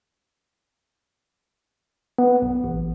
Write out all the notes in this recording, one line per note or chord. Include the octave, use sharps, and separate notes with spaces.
B3
B1
A1